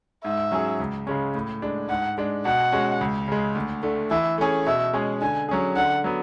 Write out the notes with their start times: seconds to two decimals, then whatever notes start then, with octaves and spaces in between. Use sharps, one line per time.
0.24 G#2 E5
0.52 F#3 C#4 G#4
0.80 C#2
1.07 C#3 G#3 C#4
1.35 A2
1.62 G#3 D4
1.89 G#2 F#5
2.18 G#3 D4
2.45 B2 F#5
2.72 G#3 C#4 F#4
3.01 C#2
3.28 C#3 G#3
3.55 D2
3.83 D3 A3
4.11 E3 E5
4.38 A3 C#4 G#4
4.66 B2 E5
4.93 G#3 C#4 G#4
5.21 D3 G#5
5.49 F#3 C#4 G#4
5.76 D3 F#5
6.04 F#3 B3